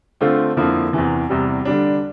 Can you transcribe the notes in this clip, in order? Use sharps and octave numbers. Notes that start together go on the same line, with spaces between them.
D3 A3 C4 F4
F2 D3 F3 A#3 E4
E2 C3 E3
E2 C3 G3
D3 G3 D4